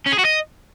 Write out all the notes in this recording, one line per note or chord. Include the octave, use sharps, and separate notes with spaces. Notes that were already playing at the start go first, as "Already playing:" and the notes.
C#4
G#4
F#4
D#5